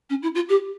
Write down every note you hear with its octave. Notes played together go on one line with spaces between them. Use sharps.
C#4
E4
F4
G4